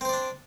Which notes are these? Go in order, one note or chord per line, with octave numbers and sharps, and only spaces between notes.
C4 D4 C5 D5